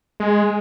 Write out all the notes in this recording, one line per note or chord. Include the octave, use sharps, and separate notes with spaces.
G#3